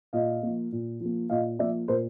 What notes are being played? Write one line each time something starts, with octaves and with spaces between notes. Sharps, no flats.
A#2 D#5 F5
F3 A#3
A#2
F3 A#3
A#2 D#5 F5
F3 A#3 D5 E5
A#2 A#4 C5